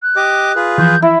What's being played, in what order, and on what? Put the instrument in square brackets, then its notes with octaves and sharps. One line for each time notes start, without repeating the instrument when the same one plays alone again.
[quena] F#6
[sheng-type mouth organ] G4 D#5 D6
F4 G#4 B4
[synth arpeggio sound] E3 F3 [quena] G6
[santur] E4 [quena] E5